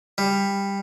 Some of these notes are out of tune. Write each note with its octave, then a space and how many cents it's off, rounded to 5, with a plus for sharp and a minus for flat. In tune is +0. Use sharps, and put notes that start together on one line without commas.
G3 +15